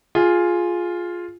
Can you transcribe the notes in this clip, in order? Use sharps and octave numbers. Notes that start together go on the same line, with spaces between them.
F4 G#4